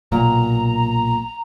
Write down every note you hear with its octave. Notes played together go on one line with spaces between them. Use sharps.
B1 A#2 A#5